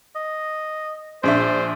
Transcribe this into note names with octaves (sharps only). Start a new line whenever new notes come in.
D#5
A#1 D4 C5 E5